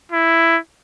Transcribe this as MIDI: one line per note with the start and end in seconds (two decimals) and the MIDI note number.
0.12 0.59 64